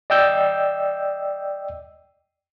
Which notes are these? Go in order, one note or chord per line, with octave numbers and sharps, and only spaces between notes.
D5 D#5 G5 E6 G6